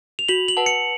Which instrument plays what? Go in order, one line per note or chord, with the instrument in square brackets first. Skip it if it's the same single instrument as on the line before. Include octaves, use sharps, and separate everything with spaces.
[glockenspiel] F7
[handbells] F#4 [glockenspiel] F#7
[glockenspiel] F#7
[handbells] B4 F#5 A5
[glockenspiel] C#7